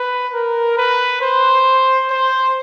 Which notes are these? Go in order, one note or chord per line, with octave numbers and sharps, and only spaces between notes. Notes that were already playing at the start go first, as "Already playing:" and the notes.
Already playing: B4
A#4
B4
C5
C5